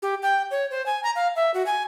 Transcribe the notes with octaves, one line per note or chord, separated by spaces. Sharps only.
G4
G5
C#5
C5
G#5
A#5
F5
E5
F#4
G#5